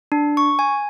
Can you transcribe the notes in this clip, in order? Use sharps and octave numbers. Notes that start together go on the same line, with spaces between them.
D4
C#6
G#5